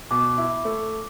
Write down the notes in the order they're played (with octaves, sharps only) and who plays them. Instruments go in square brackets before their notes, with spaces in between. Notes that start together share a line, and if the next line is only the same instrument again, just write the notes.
[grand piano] B2 [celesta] D6
[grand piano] E4
A3